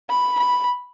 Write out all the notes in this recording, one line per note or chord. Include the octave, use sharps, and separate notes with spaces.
B5
B5